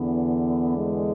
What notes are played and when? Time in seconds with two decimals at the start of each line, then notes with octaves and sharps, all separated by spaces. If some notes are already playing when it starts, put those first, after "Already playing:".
Already playing: E2 D3 B3
0.76 G#3